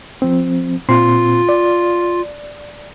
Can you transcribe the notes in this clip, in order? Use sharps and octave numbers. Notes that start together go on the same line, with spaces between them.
F3 C4
A#2 C4 F4 C6
D5